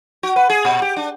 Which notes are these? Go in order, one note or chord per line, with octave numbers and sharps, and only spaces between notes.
F#4
B4
G#4
A#2
G4
D4